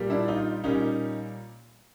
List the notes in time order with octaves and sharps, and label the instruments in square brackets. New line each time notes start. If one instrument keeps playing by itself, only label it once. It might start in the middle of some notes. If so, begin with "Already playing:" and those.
Already playing: [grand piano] A#2 G3 A#3
D4 E4
D#4 F4
A#2 G3 A#3 C#4 D#4